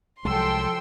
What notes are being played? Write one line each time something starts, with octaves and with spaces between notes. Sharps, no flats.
C2 F3 F#3 G#3 A4 G5 C6 E6